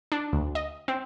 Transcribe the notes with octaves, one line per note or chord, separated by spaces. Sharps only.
D4
D2
D#5
C4